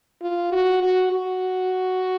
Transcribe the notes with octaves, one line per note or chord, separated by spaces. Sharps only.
F4
F#4
F#4
F#4